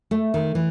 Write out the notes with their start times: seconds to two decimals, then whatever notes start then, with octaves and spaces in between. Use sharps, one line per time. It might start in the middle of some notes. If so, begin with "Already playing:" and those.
0.11 A3
0.34 D#3
0.55 E3